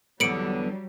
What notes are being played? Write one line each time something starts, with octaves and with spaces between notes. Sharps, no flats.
E2 D3 F#3 G3 B3 C#7 D7 F#7